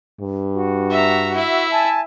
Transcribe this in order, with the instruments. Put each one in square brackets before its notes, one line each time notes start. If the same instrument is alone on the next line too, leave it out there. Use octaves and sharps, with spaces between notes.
[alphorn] G2
[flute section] F#4
[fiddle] E5 A#5
E4 E5
[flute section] G#5 A5